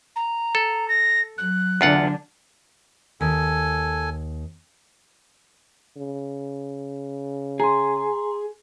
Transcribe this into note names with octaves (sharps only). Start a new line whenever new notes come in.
A#5
A4
A#6
F#3 F#6
E2 D3 F#3 D4 F4 F#5
D#2 A4 G#5
C#3
G#4 A#5 C6